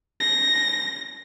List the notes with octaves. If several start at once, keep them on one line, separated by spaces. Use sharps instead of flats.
A#6